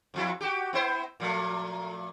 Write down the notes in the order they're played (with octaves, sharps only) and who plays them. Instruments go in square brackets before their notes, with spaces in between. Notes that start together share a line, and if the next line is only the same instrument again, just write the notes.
[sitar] F2 F3 E4
F#4 G4
B3 E4 C5
A#2 F3 A3